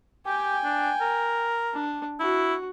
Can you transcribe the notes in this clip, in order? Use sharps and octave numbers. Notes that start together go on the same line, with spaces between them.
G4 G5 G#5
D4
A#4
D4
E4 F#4